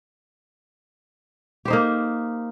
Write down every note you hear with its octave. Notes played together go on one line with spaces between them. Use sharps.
A#3 D#4 G4 C5